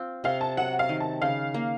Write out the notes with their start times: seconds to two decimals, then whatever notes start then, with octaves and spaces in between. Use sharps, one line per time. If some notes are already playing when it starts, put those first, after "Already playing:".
Already playing: C4 F4
0.24 C3 F5
0.41 A5
0.57 F#3 F#5
0.79 F5
0.89 D#3
1.00 A5
1.22 C#3 F5
1.54 A#3